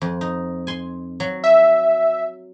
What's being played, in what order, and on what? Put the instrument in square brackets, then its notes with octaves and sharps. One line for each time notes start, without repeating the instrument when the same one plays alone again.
[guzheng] F2
D#4
G#5 C6
F#3
[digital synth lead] E5